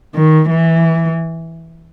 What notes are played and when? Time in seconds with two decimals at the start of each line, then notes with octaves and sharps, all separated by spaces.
0.15 D#3
0.50 E3